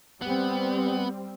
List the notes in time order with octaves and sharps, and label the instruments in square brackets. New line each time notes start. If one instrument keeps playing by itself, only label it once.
[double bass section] G3 C4 [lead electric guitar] B3